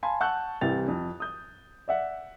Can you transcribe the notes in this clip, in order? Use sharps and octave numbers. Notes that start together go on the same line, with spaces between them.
F5 G#5 A5 B5 C6
F#5 A5 C#6 E6 F#6 G6
C2 C3 E3 G4 A6 F7
F2
D#6 G6
D5 E5 F#5